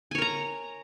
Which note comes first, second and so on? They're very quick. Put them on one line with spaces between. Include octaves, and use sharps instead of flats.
G#5 C#5 A#4 A#5